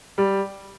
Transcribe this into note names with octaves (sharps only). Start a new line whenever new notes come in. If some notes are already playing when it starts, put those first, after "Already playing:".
G3